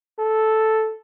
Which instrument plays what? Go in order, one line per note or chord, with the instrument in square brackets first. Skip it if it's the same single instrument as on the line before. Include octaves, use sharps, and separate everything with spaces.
[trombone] A4